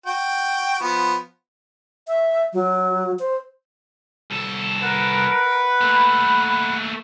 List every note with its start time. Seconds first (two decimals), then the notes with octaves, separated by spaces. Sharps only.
0.06 F#4 G5
0.81 F3 B3
2.08 E5
2.53 F#3
3.19 C5
4.31 C2 A4
4.82 A#4 B4 F#5
5.81 A3 A#3 B5